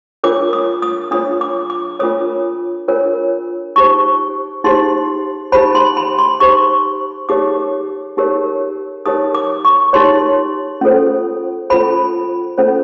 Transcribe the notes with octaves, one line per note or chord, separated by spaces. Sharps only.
D4 F4 A#4 C#5 D6
D#6
D#6
D4 F4 A#4 C#5 D#6
D6
D6
D4 F4 A#4 C#5 D#6
D4 F4 A#4 C#5
D#4 G4 C5 C#6
D#4 G4 C5 C6
D#4 G4 C5 B5
C6
B5
C6
D#4 G4 C5 C#6
D#4 G4 A#4 C#5 D6
D#4 G4 A#4 C#5
D#4 G4 A#4 C#5 D#6
D6
C#6
D#4 G4 A#4 C#5 C6
C#4 F4 A4 C5
C#4 F4 A4 C5 B5
C#4 F4 A4 C5